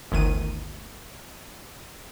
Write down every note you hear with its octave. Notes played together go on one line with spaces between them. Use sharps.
G1 D2 D#3 D#7